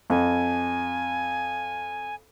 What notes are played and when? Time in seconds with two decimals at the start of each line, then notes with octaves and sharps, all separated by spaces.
0.10 F2 G#5